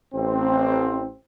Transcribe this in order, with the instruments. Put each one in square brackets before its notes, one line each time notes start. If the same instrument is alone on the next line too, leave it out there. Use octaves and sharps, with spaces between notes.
[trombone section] A1 C4